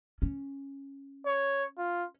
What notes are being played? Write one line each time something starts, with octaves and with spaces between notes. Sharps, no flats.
C#4
C#5
F4